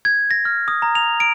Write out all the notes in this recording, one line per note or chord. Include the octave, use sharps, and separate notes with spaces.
G#6
A#6
F6
D#6
A#5
F7
D7